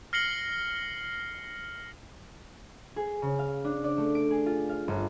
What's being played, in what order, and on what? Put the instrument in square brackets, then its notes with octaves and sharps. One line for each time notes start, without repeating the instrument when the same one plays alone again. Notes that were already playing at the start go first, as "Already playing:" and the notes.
[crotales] F6 A#6 C7 C#7 F#7 G7
[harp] G#4
C#3
F5
D4
D5
A3
D7
G#4
F4
F5
G1